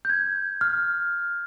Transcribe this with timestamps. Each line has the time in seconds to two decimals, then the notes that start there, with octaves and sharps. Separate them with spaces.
0.05 G6
0.10 G#6
0.61 F6